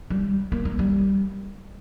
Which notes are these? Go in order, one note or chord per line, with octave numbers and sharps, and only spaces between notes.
G3
A#3
A#3
G3